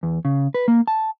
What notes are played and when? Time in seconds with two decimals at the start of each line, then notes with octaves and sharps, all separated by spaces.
0.03 E2
0.25 C#3
0.54 B4
0.68 A#3
0.87 A5